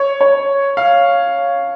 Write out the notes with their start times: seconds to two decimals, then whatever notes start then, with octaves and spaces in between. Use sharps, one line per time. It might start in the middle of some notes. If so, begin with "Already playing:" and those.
Already playing: C#5
0.21 C#5
0.77 F5